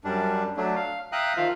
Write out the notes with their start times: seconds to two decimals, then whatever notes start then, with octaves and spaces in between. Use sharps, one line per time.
0.04 F#2 G3 D4
0.57 F#3 A3 D4
0.76 F5
1.12 E5 F5 G5 A#5 D#6 F#6
1.36 D#3 F3 F4 E5 F5